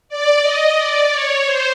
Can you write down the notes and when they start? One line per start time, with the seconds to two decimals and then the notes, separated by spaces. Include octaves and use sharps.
0.09 D5
0.42 D#5
0.76 D5
1.10 C#5
1.44 C5